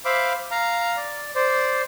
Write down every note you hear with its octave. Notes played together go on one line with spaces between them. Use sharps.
C5 E5 F5 B5 D6
F5 A#5
D5
C5 D5